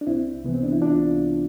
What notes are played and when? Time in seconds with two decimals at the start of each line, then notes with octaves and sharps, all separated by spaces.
0.01 D4
0.07 C2 C4 E4
0.44 C3 E3 B3
0.54 C4
0.64 D4
0.72 E4
0.81 C2 D4 F4